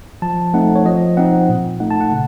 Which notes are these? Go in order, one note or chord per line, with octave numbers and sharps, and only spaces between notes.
F3 A5
A3 C4 D#4 F#5
C#5
F3 D#5
C4 D#4 F#5
A#2
A3 D#4 F#5
A5
F#5
C#3